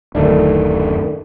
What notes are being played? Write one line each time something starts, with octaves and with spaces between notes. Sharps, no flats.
D1 F#2 D3 D#3 A3 D4